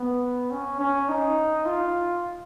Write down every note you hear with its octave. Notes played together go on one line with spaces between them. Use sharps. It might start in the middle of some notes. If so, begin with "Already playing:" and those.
Already playing: B3
C#4
C#4
D#4
F4